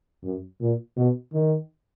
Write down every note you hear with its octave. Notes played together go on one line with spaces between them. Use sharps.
F#2
A#2
B2
D#3